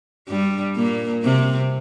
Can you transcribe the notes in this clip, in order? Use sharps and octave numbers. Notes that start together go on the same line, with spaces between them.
G2 G3
A#2 A#3
C3 C4